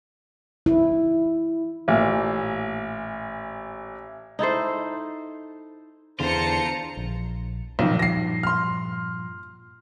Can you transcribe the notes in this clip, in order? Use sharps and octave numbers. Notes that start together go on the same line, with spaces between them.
E4
A1 A#2
D#4 E4 A4 C5
E2 D3 F4 C5 A5 A#5 C#7
A#1
B1 G2 A#2 D#3 F3
A#6 C7
C6 F6